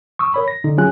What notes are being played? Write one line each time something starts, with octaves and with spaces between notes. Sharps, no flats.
C#6 D#6 E6
A#4 C#5 B5
A#6
D3 D#4
F#3 C#4 F4 G#4 G#5 F#6